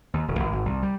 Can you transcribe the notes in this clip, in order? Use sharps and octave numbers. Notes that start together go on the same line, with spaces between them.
D#2
E1
G#1
G#1
C2
G3